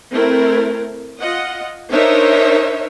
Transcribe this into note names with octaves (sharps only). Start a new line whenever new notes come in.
A3 C4 E4 A#4
F4 D#5 F#5
D4 D#4 A#4 C5 C#5 E5